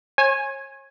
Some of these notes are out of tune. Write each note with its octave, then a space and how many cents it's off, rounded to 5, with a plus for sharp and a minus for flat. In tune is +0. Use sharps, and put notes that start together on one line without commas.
C#5 -40 G#5 +0